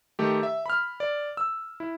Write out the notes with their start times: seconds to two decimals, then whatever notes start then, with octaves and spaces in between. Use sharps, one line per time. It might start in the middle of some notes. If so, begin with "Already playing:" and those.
0.19 D#3 A3 G4
0.43 E5
0.66 B5 F6
1.00 D5
1.37 E6
1.80 E4